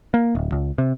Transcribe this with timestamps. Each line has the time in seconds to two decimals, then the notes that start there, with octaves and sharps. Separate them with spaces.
0.14 A#3
0.35 D1
0.52 C#2
0.78 C3